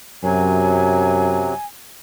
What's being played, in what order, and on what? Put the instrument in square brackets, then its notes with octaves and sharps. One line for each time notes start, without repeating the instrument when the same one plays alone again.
[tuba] F#2 [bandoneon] C3 F#3 [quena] G#5